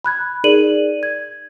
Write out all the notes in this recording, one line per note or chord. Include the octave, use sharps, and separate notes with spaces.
B5 F#6 G#6
D#4 G#4 A#4 D5 D#7 F#7
G#6